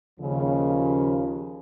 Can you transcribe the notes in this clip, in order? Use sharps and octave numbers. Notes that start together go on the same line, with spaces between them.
D#2 C#3 F3